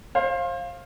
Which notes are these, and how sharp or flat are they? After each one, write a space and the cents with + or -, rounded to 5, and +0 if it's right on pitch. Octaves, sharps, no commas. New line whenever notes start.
C5 +35 F5 +0